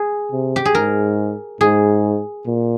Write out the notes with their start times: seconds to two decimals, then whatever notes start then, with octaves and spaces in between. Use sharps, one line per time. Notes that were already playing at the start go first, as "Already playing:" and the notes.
Already playing: G#4
0.32 C3
0.56 G4
0.65 G#4
0.74 G#2 A#4
1.61 G#2 G#4
2.46 A#2